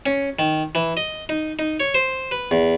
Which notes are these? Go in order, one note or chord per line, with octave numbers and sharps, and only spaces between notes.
C#4
D#3
E3
D#5
D#4
D#4
C#5
C5
B4
E2